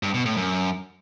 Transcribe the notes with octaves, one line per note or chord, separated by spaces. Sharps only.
G2
B2
A2
F#2